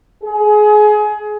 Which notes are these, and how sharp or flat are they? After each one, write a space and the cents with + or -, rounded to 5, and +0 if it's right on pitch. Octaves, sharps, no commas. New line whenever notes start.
G#4 +25